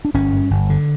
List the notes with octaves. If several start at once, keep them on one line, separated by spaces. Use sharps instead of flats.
D4
G1 C#4
G2
G1
D3